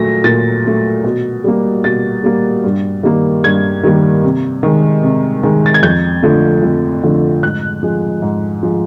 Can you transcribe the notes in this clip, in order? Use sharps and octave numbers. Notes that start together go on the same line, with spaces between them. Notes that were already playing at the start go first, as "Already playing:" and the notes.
Already playing: A#2 F#3 A3 A#6
A#2 A6
F#3 A3
B2
G3 A#3
B2 A6
G3 A#3
G2
D#3 G3 A#3
G2 G#6
D#3 G3 A#3
C3
D#3 G#3
C3
D#3 G#3
A6
G#6
F2 G6
D3 F3 A3
F2
D3 F3 A3
G#2 F#6
F3 G#3
G#2
F3 G#3